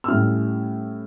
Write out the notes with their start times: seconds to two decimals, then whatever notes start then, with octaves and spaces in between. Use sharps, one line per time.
0.04 E6
0.08 A2 G3 C#4 E4 F6